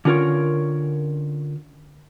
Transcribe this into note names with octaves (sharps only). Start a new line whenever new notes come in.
D3 C#4 F4 A4 A#4 C#5